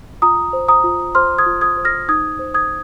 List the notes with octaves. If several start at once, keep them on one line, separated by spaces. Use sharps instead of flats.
F4 A#5 D#6
C5
A#5 D#6
F4
C5 C6 F6
D#6 G#6
F4
D#6 G#6
C5
F6 A#6
D#4 D#6 G#6
C5
D#6 G#6